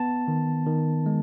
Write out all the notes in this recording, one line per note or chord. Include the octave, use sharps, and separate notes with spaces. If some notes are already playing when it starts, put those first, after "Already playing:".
Already playing: B3 A5
D#3
D#3
G#3